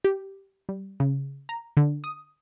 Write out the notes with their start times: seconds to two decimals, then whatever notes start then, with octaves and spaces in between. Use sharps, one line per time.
0.04 G4
0.69 G3
1.00 C#3
1.49 A#5
1.77 D3
2.04 D#6